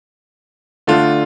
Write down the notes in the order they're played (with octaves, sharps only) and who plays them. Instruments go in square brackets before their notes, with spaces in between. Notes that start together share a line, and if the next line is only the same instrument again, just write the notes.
[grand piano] D3 A3 D4 F4